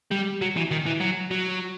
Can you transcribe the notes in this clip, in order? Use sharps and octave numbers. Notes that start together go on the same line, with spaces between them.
G3
F#3
E3
D#3
E3
F#3
F#3